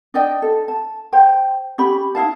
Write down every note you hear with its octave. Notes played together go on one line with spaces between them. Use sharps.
D4 D5 D#5 G5
A4
A5
C5 G5
C#4 G4 B5
D#4 E4 F5 A5